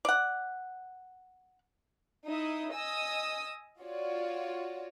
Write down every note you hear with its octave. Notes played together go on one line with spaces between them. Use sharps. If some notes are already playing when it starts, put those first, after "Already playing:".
D5 F#5
D#4 E4 E5 D#6
D#5 G#5 D#6 E6
F4 F#4 C#5 D5